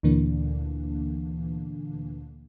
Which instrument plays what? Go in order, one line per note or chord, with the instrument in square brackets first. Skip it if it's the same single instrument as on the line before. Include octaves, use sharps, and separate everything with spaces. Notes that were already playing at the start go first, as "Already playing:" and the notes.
[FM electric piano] D2 A#2 D3 E3 A#3 D4